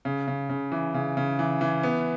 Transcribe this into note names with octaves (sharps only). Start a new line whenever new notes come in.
C#3
C#3
C#3
E3
C#3
C#3
E3
E3
B3